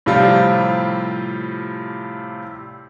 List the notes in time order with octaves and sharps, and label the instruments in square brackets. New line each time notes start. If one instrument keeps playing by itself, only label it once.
[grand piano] A2 C3 F3 G3 F4